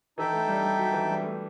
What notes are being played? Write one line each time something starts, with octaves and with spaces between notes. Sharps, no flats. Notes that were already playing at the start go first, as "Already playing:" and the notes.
E3 D#4 A4 E5 G5
A3
G3
G3
F#3
E3
G3
A3